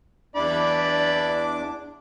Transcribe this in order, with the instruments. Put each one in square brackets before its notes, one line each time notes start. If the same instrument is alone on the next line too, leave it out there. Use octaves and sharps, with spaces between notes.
[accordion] E2 D4 D6 [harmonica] E4 D5 B5